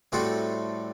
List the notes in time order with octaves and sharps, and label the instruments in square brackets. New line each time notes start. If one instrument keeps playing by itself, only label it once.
[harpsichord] A2 G3 C4 F#4 A4